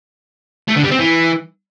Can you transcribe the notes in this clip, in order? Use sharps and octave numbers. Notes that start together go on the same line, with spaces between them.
A3
D3
G3
C4
E3